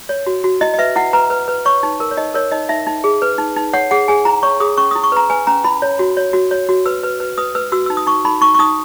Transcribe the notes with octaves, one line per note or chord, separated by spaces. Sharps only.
C#5
F#4
F#4
E4 D#5
D#5
B4 E5
E4 F#5
B4 A#5
B4
B4
C#5 C#6
D#4
A#4
C#5
D#4 D#5
A#4 C#5
D#4 D#5
D#4 E5
D#4
G#4
B4
D#4
D#4
C#5 F#5
G#4 F#5
G#4 G#5
E4 A#5
C#5 C#6
G#4 D#6
C#4 C#6
E4 D#6
C#6
B4 A#5
B4 G#5
C#4 A#5
E4 B5
C#5
F#4
C#5
F#4
C#5
F#4
B4 E6
B4
B4
B4 D#6
B4 E6
F#4 E6
D#4 E6
D#6
D#4 C#6
D#4 B5
D#4 C#6
C#6
D#4 D#6